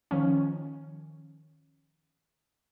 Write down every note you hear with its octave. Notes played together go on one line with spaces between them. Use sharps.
D#3 F3 C#4